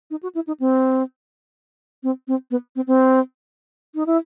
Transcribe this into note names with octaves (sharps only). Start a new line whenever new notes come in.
D#4
F#4
E4
D#4
C4
C4
C4
B3
C4
C4
D#4
E4